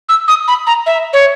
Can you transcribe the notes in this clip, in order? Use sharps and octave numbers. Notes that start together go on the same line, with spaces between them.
E6
D#6
B5
A#5
E5
C#5